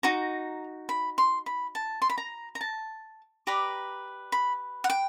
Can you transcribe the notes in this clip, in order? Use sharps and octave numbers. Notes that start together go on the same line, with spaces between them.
D#4 F#4 A#5
B5
C6
B5
A5
C6
B5
A#5
A#5
A5
G4 B4 D5 A#5
B5
F#5
G5